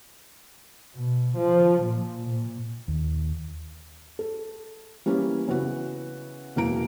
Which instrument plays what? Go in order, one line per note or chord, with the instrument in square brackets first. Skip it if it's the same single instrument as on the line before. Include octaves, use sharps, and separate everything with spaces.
[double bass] B2
F3
A#2
A#2
[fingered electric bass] D#2
[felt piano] A4
E3 G3 A#3 C#4
C#3 E3 B3 F#4 B4
E1 E3 A#3 A#5 D7